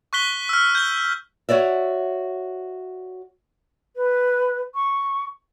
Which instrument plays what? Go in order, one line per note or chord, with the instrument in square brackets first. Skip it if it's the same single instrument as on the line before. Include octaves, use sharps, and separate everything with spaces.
[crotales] C#6 F#6 B6 G7
E6 F6
G6 G7
[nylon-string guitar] F#4 C#5 D5 E5
[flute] B4
C#6